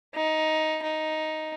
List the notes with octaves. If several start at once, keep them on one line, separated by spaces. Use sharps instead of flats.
D#4
D#4